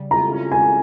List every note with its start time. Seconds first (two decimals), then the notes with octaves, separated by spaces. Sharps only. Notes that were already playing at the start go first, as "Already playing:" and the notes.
Already playing: C#3 G3
0.11 F4 A#5
0.31 C#4
0.51 C#3 G#5